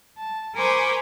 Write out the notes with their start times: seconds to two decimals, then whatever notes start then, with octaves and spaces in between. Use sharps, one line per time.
0.18 A5
0.56 A#4 C5 G#5 B5 C#6 D6